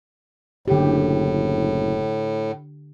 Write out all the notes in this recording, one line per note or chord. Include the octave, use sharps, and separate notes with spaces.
F#1 A2 D3 G4